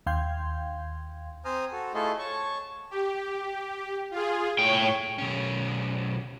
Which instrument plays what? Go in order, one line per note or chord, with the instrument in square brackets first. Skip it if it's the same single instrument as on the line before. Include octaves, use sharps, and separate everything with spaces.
[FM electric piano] D#2 F5 G5 C6 G6 G#6
[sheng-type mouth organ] C4 C5 G#5 A#5 D#6 F6
F#4 A4
A3 E4 F4 G#4 A4 D#5
C#5 A5 C#6
[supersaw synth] G4
F4 G#4
[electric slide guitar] A2 G5 [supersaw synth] C#5
[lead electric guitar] B1 C#4